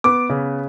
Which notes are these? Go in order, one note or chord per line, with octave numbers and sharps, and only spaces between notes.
B3 D6
C#3